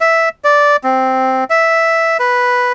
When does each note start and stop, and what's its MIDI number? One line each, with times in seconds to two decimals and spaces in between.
0.01 0.29 76
0.44 0.76 74
0.84 1.44 60
1.50 2.17 76
2.20 2.72 71